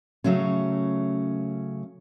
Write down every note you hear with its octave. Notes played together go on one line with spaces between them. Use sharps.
C#3 F#3 A3 C#4